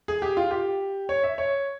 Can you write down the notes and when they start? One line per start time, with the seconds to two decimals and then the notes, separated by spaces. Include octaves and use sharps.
0.08 G#4
0.22 G4
0.37 F4
0.51 G4
1.09 C#5
1.23 E5
1.38 C#5